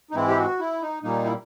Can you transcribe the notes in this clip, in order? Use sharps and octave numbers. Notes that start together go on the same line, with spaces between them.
D#4
G#2 E3 G#3 C4 E4
G4
F#4
E4
D#4
A#2 G3 A#3 D#4
E4